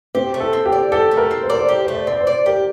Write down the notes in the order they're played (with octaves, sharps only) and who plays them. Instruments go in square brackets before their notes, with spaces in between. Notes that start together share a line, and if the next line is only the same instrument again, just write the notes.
[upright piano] C4 [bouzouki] G4
[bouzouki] A3
[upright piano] A4
[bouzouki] C4
[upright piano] G4
[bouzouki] D5
[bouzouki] G4 [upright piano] A4
[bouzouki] A3
[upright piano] A#4
[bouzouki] C4
[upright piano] C5
[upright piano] A#4 [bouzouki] D5
[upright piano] C5
[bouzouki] G4
[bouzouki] A3 [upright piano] C5
[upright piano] D5
[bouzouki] C4 [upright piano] D5
[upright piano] C5
[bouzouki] D5
[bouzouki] G4 [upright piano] A#4